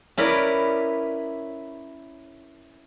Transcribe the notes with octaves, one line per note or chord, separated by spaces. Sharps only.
C#4 E4 A#4 B4 D5